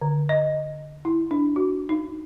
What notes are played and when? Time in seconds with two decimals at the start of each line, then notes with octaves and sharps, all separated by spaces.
0.01 D3
0.29 D#5
1.05 E4
1.31 D4
1.56 F#4
1.89 D#4